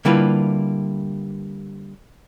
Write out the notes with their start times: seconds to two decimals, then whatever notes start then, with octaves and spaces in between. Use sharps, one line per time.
0.05 D3 G3 A#3 E4 F4 B4